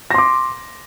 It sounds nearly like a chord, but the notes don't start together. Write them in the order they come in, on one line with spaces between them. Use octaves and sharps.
A#6 C6 D6